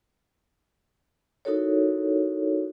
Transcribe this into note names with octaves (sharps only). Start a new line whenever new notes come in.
D#4 E4 F#4 A4 A#4 C#5